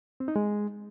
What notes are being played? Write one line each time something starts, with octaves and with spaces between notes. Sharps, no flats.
C4
D#4
G#3